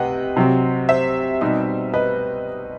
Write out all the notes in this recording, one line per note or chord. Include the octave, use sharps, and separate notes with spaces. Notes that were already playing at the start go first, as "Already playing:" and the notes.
Already playing: C3 B4 D#5 F#5 G5
C3 F#3 C4
C5 E5
B2 G3 C4 D#4
B4 D#5